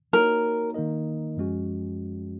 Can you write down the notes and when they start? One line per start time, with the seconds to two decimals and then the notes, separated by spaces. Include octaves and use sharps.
0.13 A#3 D#4 F#4 A#4 C#5
0.74 D#3 A#3 D#4 A#4 D#5
1.37 F#2 F3 G#3 C#4 F#4